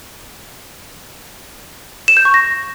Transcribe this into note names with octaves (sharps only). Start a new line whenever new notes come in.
E7
G6
C#6
A#6